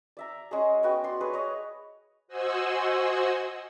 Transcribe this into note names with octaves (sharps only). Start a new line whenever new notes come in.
D5 E5 A#5
G#3 C#4 G#4
B3 F#4 G5
D5 C6
G#4 B4 C#5
C#5 D#5
F#4 C5 D#5 F#5 G#5 E6